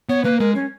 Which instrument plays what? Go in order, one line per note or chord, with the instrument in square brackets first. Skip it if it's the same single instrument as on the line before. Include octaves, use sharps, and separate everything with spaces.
[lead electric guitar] B3 [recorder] C#5
[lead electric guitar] A#3 [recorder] B4
[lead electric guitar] G#3 [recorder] A#4
[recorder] C#4